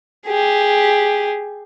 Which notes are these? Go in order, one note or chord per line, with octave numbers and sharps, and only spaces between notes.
G4 G#4